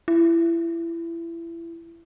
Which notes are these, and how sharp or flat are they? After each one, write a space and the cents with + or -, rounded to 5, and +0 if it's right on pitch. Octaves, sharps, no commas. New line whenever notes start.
E4 +25